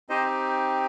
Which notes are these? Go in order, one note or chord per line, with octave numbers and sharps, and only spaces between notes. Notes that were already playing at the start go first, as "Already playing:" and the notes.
C4 D#4 G4 C5 D#5